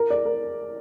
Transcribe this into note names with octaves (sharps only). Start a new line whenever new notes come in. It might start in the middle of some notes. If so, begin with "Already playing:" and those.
Already playing: A#4
D5
A#4